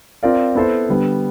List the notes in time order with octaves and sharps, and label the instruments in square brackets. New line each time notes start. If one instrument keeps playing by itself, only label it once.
[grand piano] C4 F4 A#4 D5 F5
B3 E4 A4 C5
D3 G3 B3